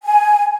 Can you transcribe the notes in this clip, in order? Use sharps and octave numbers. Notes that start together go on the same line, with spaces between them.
G#5